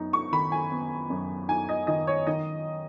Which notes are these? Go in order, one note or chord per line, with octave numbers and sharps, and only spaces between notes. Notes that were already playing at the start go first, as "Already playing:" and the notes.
Already playing: F#2 B3 D#4
C#6
D#3 B5
G#5
B3
F#2
D#4 G#5
D#5
D#3 D#5
C#5
D#3 D#5